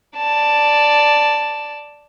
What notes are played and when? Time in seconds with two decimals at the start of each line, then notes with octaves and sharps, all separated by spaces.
0.17 D5 A5